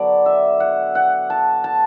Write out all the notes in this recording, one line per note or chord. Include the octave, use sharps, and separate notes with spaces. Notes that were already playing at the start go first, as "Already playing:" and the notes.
Already playing: D3 F#3 B3 D5
E5
F#5
F#5
A5
A5